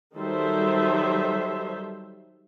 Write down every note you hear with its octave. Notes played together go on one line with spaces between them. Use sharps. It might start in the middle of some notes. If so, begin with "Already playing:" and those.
D#3 F#3 G3 A4 C5 E5